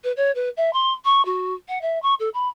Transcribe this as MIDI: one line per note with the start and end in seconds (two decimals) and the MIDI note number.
0.04 0.12 71
0.17 0.31 73
0.35 0.49 71
0.57 0.72 76
0.73 0.93 84
1.05 1.24 85
1.25 1.54 66
1.68 1.81 78
1.81 2.01 76
2.02 2.14 85
2.20 2.29 69
2.34 2.48 83